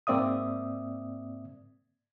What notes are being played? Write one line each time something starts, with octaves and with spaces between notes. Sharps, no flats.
G#2 A#3 C4 D5 E5 D#6